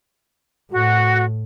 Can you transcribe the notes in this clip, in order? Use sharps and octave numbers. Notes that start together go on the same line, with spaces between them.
A2 F#4